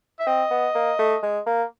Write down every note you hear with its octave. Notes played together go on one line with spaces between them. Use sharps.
E5
C4 D#5
B3
A#3
A3
G#3
A#3